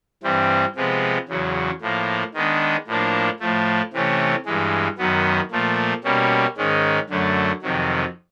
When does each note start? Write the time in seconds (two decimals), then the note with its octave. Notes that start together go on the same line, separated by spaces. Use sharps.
0.23 G2 E3 G3 C4
0.75 C3 F3 G#3 B3
1.28 E2 C#3 F#3
1.81 A2 F3 A#3
2.34 D#3 G#3 B3 D4
2.87 A2 F3 A#3 D4
3.40 A2 F3 A3
3.93 C3 E3 A3 C#4
4.46 G2 E3 G#3
4.98 F#2 D#3 F#3 B3
5.51 A#2 F3 A3
6.04 B2 G3 A#3 C#4
6.57 G#2 D#3 G#3 C#4
7.10 F#2 D3 F#3 A3
7.62 F2 C3 D#3 F#3